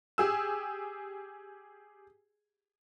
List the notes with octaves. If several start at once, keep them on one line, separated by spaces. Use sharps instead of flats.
G4 G#4 E6